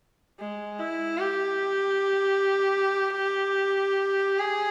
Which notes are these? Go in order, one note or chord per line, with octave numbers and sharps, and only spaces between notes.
G#3
E4
G4
G#4